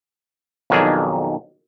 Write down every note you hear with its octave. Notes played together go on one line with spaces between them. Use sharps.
B1 F2 D#3 F#3 D4 G#4